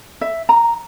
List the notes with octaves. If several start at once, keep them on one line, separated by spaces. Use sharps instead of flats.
E5
A#5